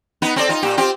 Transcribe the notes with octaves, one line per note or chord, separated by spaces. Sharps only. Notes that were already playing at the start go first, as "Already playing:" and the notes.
B3 D#4 B4
C4 A4 D5
D#4 F4
A#2 G4
C4 F4 G4